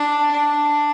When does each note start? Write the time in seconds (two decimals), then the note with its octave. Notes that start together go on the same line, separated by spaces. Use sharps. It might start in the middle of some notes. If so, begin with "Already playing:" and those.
Already playing: D4
0.31 D4